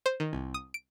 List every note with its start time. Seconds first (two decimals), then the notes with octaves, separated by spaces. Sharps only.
0.06 C5
0.20 D#3
0.33 C2
0.54 D#6
0.74 D7